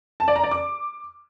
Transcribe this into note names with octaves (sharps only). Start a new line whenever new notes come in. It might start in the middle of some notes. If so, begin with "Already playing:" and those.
A5
D5
A#5
D5
D6